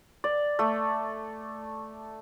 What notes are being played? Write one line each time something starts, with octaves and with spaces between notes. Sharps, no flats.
D5
A3